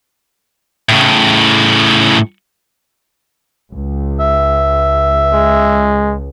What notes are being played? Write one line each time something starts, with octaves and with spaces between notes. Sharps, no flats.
A2 C#3
C#2
E5
G#3